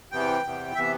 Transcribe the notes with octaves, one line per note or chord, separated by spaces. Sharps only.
E2 C3 E3 B3 G5
E2 C3 E3 B3
C3 E3 B3 E5